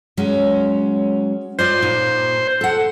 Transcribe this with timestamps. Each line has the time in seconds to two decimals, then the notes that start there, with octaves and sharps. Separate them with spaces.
0.17 F#3 G#3 C#4
1.59 F4 C5 D5 D#5
1.82 A#2 D#4
2.61 A4 F#5